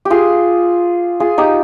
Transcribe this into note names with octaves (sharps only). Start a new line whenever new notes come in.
G4
F4 G#4
F4 G#4
D#4 G4